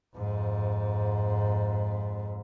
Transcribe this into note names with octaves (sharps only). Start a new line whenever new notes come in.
F2 G#2